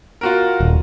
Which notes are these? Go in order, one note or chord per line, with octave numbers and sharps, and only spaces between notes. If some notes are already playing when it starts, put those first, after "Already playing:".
F4 F#4 A#4
D#1